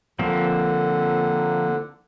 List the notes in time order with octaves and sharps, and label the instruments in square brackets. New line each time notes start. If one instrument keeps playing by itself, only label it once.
[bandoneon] D3 [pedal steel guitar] F3 A#3 C4